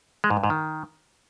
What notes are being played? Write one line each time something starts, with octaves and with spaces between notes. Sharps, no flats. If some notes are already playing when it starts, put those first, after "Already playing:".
G#3
G#2
G2
G#2
D#3